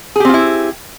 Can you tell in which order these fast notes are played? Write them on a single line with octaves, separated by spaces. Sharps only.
G#4 G4 C4 F4 E4